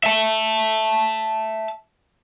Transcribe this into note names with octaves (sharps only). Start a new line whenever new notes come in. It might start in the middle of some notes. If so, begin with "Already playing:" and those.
E5 A5